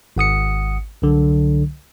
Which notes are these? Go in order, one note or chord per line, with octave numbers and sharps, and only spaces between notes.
G#1 F#5 D#6 C#7
C2 D3 F#3